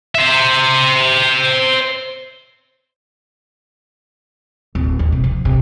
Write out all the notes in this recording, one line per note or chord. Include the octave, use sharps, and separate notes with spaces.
C5 E5
D1
D#2
C3
F3
C3